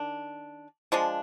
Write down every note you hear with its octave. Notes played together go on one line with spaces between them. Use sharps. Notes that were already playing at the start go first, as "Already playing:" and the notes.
Already playing: D#3 D4
F3 G#3 D4